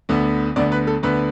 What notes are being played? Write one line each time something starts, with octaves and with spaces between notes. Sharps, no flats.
D2 D3 B3
D2 D3 B3 D5
B4
A4
D2 D3 B3 B4